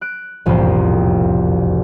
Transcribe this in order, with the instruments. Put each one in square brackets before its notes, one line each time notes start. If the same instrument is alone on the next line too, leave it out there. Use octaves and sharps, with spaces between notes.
[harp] F#6 D7
E1 C2 F2 A2 A#3 C5